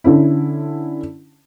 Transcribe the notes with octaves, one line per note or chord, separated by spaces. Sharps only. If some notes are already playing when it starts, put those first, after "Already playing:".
D3 C#4 E4